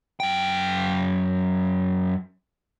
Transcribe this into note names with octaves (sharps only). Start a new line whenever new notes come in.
F#2 G5